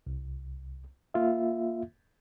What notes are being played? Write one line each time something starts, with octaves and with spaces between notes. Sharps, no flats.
C2
A#3 F4 E5